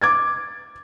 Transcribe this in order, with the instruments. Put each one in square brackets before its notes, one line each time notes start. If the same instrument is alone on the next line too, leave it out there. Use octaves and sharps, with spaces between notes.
[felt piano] D6 G#6 A6